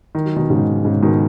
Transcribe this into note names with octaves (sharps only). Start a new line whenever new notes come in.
D#3
F#3
B2 D#3
G#2 C#3
G#2 C#3
B2 D#3